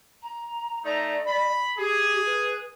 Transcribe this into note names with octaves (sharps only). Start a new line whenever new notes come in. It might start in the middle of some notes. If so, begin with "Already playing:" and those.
A#5
A3 D#4 D5 A#5
B5
G4 G#4
B4